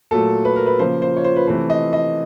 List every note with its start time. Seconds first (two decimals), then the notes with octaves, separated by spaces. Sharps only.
0.11 A#2 F#3 A3 A4
0.45 B4
0.56 A#4
0.66 B4
0.79 C#3 F3 A#3 C5
1.02 C5
1.17 C#5
1.24 C5
1.36 B4
1.47 C3 E3 A3 C5
1.70 D#5
1.93 D#5